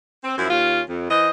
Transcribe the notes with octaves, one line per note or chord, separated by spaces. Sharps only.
C4
F#2 F3 E4
D#2 C#4 F4
F2
E3 C5 D#5